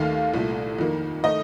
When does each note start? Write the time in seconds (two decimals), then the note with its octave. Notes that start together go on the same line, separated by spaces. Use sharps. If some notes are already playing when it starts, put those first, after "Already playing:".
Already playing: D#2 D#3 A3 F5
0.34 C2 A#2 A3
0.79 F2 D#3 A#3
1.24 D#3 A3 D#5